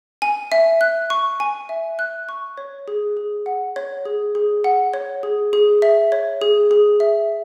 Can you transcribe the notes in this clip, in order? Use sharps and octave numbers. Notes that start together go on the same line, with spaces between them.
G#5
E5
F#6
C#6
G#5
E5
F#6
C#6
C#5
G#4
G#4
F#5
C#5
G#4
G#4
F#5
C#5
G#4
G#4
E5
C#5
G#4
G#4
E5